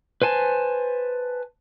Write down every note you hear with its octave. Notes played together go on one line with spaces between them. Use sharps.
B4 C5 G#5 A5